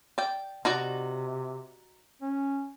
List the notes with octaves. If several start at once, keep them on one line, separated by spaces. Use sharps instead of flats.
D5 G5
C3 D#4 F#4 D5
C#4